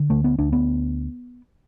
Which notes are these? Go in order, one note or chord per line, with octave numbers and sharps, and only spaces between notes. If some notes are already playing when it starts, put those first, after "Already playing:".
Already playing: D3
D2 A3
B3
D2 D4
B3